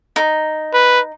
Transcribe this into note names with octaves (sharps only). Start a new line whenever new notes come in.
D#4
B4